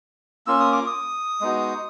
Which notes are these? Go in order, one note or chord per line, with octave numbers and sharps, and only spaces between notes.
A#3 C#4 F4 E6
D#6
D6
D#6
G#3 B3 D#4 F#4